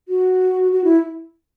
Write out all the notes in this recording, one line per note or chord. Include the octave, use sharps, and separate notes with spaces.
F#4
F#4
E4